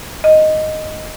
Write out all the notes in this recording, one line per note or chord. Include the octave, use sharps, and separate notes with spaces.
D#5